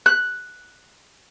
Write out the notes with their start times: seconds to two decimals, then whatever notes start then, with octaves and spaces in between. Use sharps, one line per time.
0.06 F#6